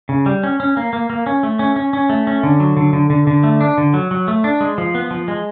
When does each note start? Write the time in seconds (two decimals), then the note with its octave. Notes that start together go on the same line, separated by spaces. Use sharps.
0.09 C#3
0.26 G3
0.43 C#4
0.60 C#4
0.77 A#3
0.93 A#3
1.10 A#3
1.26 C#4
1.43 A3
1.59 C#4
1.76 C#4
1.93 C#4
2.09 A3
2.27 C#4
2.43 D3
2.60 F#3
2.77 D3
2.93 D3
3.10 D3
3.27 D3
3.44 A3
3.61 D4
3.78 D3
3.94 F#3
4.11 F#3
4.28 A3
4.44 D4
4.61 G#3
4.78 F3
4.95 B3
5.11 F3
5.28 G#3